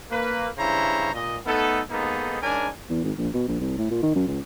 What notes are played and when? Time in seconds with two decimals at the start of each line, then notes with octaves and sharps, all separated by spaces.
0.11 A#3 B4
0.58 G2 C#3 E4 C5 C#5 A#5
1.13 A#2 D#5
1.46 A3 B3 D#4 A4
1.90 G#2 A#3 B3 D#4 G#4 A4
2.42 G#2 C#4 D4 A#4 G#5
2.89 E2
3.04 G#1
3.18 A#1
3.34 B2
3.48 A#1
3.60 C2
3.78 A2
3.91 A#2
4.03 D#3
4.15 F#2
4.27 C#2